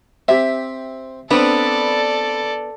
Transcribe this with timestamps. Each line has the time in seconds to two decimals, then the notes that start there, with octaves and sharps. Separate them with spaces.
0.28 C4 G4 E5
1.31 B3 C4 D4 A4 B4 D5 A#5